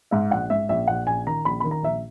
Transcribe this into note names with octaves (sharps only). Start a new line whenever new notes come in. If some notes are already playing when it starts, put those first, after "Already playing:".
G#2 E5
A#1 F#5
G#2 E5
A#1 E5
A#1 F#5
A#1 G#5
D#3 A#5
A#1 B5
D#3 B5
A#5
A#1 E5